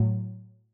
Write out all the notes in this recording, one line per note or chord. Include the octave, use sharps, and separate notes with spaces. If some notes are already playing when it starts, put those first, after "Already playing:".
Already playing: A2 F#3